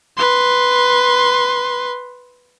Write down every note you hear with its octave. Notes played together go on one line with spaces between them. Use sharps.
B4 C6